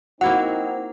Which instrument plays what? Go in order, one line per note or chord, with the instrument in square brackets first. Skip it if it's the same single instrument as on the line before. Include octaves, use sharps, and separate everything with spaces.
[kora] A#3 E4 F#4 [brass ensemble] C4 D#4 C5 [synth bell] F#5